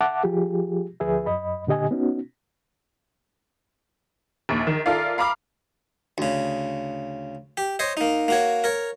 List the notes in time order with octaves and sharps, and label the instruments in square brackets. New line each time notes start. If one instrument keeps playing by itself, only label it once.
[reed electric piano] E5 F#5 A5 D6
F3 F4 G4 G#4
D2 F3 G#4 B4 E5
F#2 D#5 B5
A#2 D3 G4 D#5 G#5
B3 C#4 D#4 F#4
[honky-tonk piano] A#1 D#2
D#3
F4 A4 A#4 D5 E5 F5
F5 A#5 B5 D6 F6
[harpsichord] D2 C#3
G4
C5 C#5 D#5
A#3 D#4
A#3 F#4 C#5
A#4 C#5